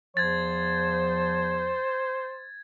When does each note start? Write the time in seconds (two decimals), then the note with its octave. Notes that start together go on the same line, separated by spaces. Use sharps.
0.17 E2 F3 C5 G#6 A6